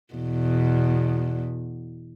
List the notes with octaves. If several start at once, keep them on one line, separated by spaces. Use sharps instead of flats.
E2 B2